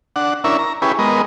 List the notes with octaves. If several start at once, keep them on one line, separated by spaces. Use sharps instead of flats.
D4 F#5
C#4 D4 E4 A#4 E5
A#5
C#4 E4 G4 G#4 B4
G#3 B3 A#4 D#5